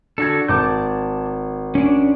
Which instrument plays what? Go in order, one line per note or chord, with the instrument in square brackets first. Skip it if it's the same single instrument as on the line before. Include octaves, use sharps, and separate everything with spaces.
[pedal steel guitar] D3 F#4 A4 [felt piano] D4 G#6
[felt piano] G#1 [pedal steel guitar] A5 D6 G6
[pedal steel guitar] C#4 D4